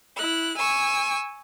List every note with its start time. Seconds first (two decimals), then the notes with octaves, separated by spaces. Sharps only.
0.15 E4 F#6
0.57 G#5 C#6 E6